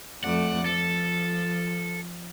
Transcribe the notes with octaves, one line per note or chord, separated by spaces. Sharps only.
F2 A3 D5 F#5
F3 A4